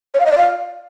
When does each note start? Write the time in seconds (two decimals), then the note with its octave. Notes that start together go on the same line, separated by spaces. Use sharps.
0.14 C#5
0.20 F5
0.26 D#5
0.32 D5
0.37 F5